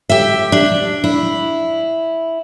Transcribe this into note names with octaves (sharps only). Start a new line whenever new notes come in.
G4 E5
D4
E4